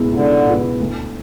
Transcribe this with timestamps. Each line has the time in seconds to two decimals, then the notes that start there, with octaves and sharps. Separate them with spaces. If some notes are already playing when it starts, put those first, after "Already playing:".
Already playing: C#2 B2 G#3 B3 E4
0.13 C#2 D3
0.47 B2 G#3 B3 E4
0.80 D2